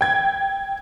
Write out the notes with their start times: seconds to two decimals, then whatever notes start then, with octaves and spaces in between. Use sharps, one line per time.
0.01 G5 G#6